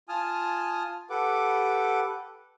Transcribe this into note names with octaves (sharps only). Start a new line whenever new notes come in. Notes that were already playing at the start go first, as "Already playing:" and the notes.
F4 G#5 A5 D#6 F6
G4 A4 B4 F#5 D6